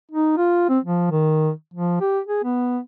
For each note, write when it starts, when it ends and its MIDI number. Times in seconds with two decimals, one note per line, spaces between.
0.11 0.35 63
0.37 0.68 65
0.69 0.79 60
0.84 1.06 53
1.11 1.50 51
1.74 2.01 53
2.01 2.20 67
2.27 2.43 68
2.44 2.79 59